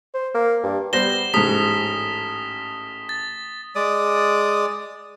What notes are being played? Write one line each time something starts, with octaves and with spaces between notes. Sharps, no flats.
C5
A#3
G2
G3 B3 C5 A#6 E7 G7
A1 G#2 D#6 B6
A6
G#3 D5 D#6